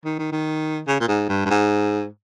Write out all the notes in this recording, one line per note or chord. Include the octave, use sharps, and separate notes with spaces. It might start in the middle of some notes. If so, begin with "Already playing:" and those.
D#3
D#3
D#3
C#3
A#2
G#2
G2
G2
G#2